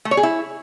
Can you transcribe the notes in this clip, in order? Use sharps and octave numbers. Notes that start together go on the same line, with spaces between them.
A3
C#5
G#4
E4